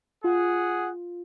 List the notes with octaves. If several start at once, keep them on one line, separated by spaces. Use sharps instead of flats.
F4 G#4 F#5